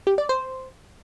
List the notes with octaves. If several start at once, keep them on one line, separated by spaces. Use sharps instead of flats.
G4
D5
C5